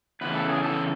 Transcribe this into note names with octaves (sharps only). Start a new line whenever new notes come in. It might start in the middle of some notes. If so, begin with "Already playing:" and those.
E2 C#3 E3 B4
A4
G#4
A4